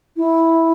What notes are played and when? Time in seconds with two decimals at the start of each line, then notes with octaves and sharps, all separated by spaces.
0.17 E4